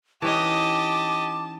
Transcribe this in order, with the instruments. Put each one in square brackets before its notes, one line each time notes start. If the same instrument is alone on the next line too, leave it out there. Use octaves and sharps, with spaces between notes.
[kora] E3 C#4 D#4 [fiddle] G4 D#5 [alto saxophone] A5 [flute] D6